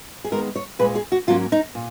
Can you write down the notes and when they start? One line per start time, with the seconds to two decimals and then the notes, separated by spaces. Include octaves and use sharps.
0.24 G#4
0.31 D#2 D#3 G#3 B3 A#4
0.56 C#5
0.79 A#2 G#3 C#4 B4
0.95 G#4
1.12 F#4
1.27 G#2 F#3 A#3 C#4 F4
1.52 D#4
1.75 A#2